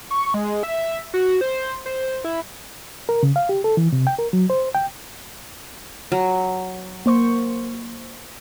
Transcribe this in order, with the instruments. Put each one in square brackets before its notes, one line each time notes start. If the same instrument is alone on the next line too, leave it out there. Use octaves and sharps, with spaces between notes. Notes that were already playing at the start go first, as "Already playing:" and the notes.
[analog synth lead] C#6
G#3
E5
F#4
C5
C5
E4
[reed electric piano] A#4
C#3
F5
G4
A4
E3
C3
G5
A#4
F#3
C5
G5
[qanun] F#3
[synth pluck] A#3 C5 C#6